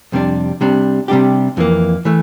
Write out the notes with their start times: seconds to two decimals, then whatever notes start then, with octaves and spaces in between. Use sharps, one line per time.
0.12 F2 C3 G3 D4
0.61 C2 C3 G3 D4
1.08 C3 G3 D4 G4
1.57 F2 E3 A#3
2.05 E3 A3